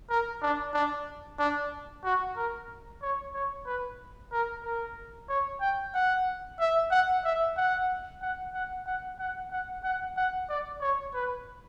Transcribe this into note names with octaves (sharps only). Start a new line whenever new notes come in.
A#4
D4
D4
D4
F#4
A#4
C#5
C#5
B4
A#4
A#4
C#5
G5
F#5
E5
F#5
E5
F#5
F#5
F#5
F#5
F#5
F#5
F#5
F#5
D5
C#5
B4